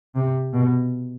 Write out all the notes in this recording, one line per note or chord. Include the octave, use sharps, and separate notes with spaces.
C3
B2